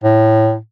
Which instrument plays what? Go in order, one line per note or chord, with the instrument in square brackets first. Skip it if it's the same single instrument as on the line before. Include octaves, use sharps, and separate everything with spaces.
[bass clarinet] A2